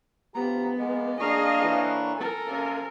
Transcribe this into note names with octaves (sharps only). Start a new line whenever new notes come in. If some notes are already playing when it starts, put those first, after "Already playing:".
D2 F3 B3 G4 A#5
G#3 A#3 G#4
A#3 D4 G#4 D#5 F5 C#6
A2 E3
A4 A#4 G#5
C3 A#3 C#4